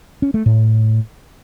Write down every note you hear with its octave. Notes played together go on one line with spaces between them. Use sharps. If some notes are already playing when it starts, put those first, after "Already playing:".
C#4
A3
A2